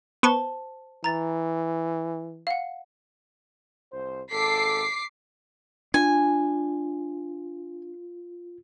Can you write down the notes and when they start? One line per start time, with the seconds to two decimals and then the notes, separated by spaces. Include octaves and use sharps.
0.23 B3 C5 A5 C#6 G7
1.04 E3 A#5 A6
2.47 F5 F#5
3.92 C2 C5
4.32 G#1 A4 D6 B6 C7
5.94 D4 F4 G#5